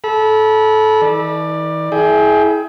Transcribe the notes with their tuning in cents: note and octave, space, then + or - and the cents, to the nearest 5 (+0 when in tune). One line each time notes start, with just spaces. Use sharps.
A4 -20 B5 -30
E3 -45 D5 +15
E4 -15 G#4 +25 G5 +10